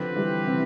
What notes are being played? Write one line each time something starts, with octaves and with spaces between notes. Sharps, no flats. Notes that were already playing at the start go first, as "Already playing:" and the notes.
Already playing: D3 F3 C4 G4 B4
E3 G3
C3 E3